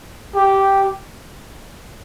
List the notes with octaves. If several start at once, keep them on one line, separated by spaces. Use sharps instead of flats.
G4